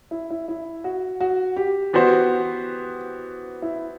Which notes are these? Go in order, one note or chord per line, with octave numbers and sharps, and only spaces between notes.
E4
E4
E4
F#4
F#4
G4
E3 B3 F#4 C5
E4